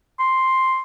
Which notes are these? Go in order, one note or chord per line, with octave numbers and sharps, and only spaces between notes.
C6